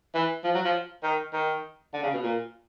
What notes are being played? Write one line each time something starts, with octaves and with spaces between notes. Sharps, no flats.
E3
F3
F#3
F3
D#3
D#3
D3
C#3
B2
A#2